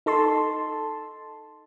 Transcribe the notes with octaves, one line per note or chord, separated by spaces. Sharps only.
D#4 A4 A5 C6